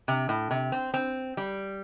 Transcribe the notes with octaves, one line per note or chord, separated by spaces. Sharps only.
C3
A2
C3
C4
C4
G3